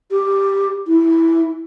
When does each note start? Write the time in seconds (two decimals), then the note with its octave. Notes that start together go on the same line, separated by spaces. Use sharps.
0.11 G4
0.87 E4